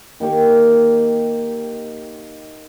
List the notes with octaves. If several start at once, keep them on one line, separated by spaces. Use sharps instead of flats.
D#3 A#3 G4 C#6